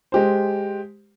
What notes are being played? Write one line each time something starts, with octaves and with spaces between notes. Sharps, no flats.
G#3 G4 C5